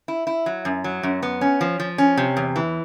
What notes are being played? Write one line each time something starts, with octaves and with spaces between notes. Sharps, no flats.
E4
E4
F#3
F#2
F#3
F#2
B3
C#4
F3
F3
C#4
C3
E2
E3